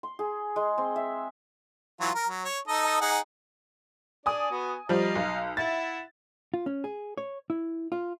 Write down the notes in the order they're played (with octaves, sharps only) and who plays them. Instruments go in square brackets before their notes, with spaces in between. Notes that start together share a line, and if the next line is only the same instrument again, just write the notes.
[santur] C6
G#4
G#3
C4
E5
[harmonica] E3 F#3 F4
A#4
F#3
C#5
D#4 A4 D#5
D#4 G#4 F#5
[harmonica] D4 D5 [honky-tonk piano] G#5 D#6
[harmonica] B3 F#4
[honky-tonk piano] F3 G3 [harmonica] D#5 F5 A#5
[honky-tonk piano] B1
[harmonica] E4 E5 F#5 [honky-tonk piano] A6
[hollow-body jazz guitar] F4
C#4
G#4
C#5
E4
F4